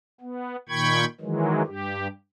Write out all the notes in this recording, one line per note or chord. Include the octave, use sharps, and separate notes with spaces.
B3
A#2 D#3 G5 B5 C#6 G#6
D#3 E3 F#3 G#3
G2 G4